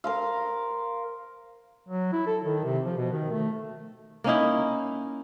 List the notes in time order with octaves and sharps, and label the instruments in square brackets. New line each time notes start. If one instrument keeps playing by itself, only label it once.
[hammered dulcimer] A#4 C5 F5
[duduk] F#3
E4
A4
D#3
C3
F3
B2
D#3
A3
[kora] A#3 C#4 D#4 E4